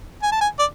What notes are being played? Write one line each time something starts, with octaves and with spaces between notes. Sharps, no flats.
G#5
A5
G#5
D5